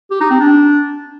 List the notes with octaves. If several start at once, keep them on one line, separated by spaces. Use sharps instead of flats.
G4
D#4
C4
D4